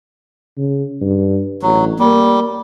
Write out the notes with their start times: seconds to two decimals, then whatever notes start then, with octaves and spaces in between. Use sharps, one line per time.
0.57 C#3
1.01 G2
1.62 A1 F#3
1.99 G3 A#3